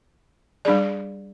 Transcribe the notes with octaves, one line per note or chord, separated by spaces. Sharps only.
G3 D4 G#4 D5